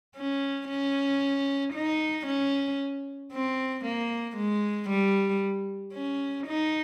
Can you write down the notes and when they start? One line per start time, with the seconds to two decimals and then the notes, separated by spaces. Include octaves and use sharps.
0.16 C#4
0.69 C#4
1.74 D#4
2.27 C#4
3.32 C4
3.85 A#3
4.37 G#3
4.89 G3
5.93 C#4
6.47 D#4